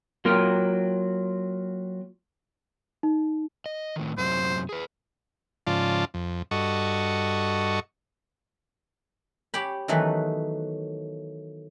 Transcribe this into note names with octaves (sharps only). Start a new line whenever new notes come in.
F#3 A#3 F4 A#4 G5
D#4
D#5
A2 D#3
F#2 C3 F#3 C5
G#4 B4
G#2 C#3 F3 F4 D5 A5
F2
G2 F#4 A4 D#5 C#6
G4 C#5 G5 B5
D#3 E3 F#3 A3 B3